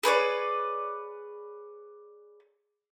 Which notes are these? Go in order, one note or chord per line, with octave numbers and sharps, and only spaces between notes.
G#4 B4 C#5 D5